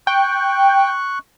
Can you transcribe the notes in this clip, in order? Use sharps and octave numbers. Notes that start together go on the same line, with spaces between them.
G5 C#6 F#6